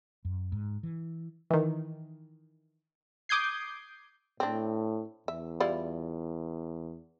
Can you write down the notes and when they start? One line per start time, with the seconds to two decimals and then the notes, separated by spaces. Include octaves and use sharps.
0.25 F#2
0.52 G#2
0.83 E3
1.50 D#3 E3
3.29 D6 D#6 G6 G#6 C7
4.40 A2 C4 D4
5.28 E2 E5
5.60 G3 E4 F4